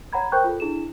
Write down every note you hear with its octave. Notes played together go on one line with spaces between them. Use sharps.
C#5 F#5 A#5 B5 G#6
A#4 C5 G5 C#6 F#6 G6
F4 A4
D4 E4 G#4 E7